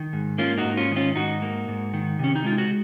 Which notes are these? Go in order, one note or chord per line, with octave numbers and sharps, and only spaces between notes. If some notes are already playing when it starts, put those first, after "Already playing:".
Already playing: D#3
G#2
A#3 C#4 F4
D#4 F#4
G#2
C#4 F4
D#3
C#4 F4
G#2 D#4 F#4
A#3
G#2
D#3
C3 C#4
D#4
G#3 F4
F#4